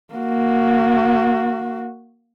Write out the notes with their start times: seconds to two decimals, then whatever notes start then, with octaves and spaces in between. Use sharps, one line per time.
0.14 A#3 F#4